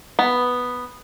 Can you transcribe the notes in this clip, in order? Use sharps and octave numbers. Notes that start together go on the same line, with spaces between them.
B3